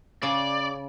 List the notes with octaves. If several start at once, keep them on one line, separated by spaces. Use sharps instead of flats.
C#3 D5